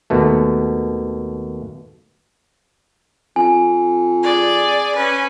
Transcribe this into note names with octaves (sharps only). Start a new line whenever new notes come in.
D#2 B2 A3
F2 G#5
G#4 D5
C#4 B4